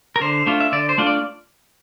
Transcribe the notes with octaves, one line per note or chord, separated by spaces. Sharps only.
A#4
D3 C5
A3 D4 F4
E5
D3 D5
C5
A3 D4 F4
D5